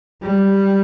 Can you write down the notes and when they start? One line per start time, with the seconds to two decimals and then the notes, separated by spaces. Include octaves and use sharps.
0.22 G3